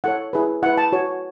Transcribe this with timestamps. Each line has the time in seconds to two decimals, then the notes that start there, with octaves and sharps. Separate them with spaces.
0.04 E4 A4 C#5 F#5
0.33 E4 G#4 B4
0.63 E4 B4 F#5
0.78 A5
0.92 F#4 C#5